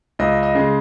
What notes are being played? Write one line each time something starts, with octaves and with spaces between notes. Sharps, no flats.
C#2 D#5
D#5
C#3 G#3